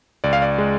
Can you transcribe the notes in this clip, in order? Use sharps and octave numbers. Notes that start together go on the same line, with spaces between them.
C#2 D5
F5
D5
G#3